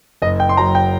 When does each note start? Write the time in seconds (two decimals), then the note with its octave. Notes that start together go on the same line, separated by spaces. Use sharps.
0.22 F#1 D#5
0.40 G5
0.49 C6
0.57 F#2 F#3 A#5
0.75 G5